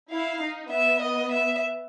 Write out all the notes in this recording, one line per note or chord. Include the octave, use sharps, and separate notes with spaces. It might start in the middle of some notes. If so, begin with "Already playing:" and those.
E4 F5
D#4
B3 E5
D#5
E5